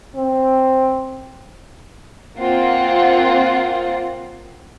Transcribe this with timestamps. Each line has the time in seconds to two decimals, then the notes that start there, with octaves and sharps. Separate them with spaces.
0.15 C4
2.39 A#3 C4 F4 F#5